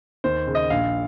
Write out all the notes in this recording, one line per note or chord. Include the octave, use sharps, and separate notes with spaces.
D#2 C5
C#3
D#5
A#1 F5